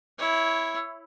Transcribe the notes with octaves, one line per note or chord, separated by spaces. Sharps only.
E4 C#5